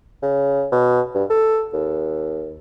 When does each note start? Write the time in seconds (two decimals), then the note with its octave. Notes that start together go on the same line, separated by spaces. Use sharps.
0.22 C#3
0.72 B2
1.15 G2
1.30 A4
1.73 D#2